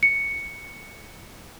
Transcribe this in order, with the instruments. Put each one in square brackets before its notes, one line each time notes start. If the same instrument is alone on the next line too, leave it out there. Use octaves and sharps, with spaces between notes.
[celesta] C#7